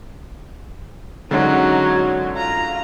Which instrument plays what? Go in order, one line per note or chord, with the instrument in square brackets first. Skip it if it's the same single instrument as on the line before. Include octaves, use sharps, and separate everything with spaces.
[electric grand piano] D3 G#3 C#4 [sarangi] F#3 [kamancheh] D#4 F#4
[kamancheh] F4 [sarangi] A#5